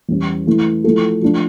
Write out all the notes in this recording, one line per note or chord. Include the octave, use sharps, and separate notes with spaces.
E2 E3 G3 C#4
E3 A3 E4
F3 A3 E4 A4
F3 A3 D4